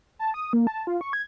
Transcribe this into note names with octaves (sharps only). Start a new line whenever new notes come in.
A5
D#6
A#3
A5
F4
C#6
G#6